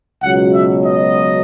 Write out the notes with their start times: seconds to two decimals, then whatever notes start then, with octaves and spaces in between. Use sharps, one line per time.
0.23 C#2 B2 F#3 F#5
0.54 E5
0.85 D#5